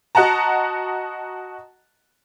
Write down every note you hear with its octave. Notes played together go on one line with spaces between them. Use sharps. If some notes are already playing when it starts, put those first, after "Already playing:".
F#4 D#5 F#5 A5 A#5